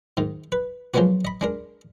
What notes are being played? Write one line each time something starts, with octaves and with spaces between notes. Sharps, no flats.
G#2 D#3
B4
F3 F#3 G#3 A#3 B3 F#4
D#5 B5
G#3 D4 A#4